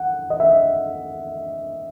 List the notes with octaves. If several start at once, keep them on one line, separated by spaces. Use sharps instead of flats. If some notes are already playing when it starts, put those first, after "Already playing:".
Already playing: F#5
D#5
E5